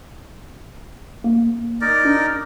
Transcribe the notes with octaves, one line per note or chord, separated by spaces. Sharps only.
A#3
D#4 A#4 D5
D4